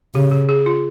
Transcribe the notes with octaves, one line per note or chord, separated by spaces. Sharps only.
C#3 G4
G#4
G#4
F4